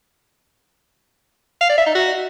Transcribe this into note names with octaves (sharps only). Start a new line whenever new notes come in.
F5
D5
E5
D#4
F#4